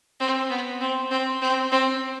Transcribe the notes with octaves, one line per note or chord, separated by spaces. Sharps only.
C4
B3
C4
C4
C4
C4